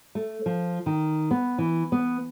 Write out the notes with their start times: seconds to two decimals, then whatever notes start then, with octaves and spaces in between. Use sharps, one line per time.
0.15 A3
0.46 F3
0.86 D#3
1.31 B3
1.58 E3
1.92 B3